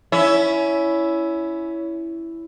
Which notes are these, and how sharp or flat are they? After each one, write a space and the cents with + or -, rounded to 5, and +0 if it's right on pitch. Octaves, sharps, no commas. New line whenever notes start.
C#4 +20 E4 +0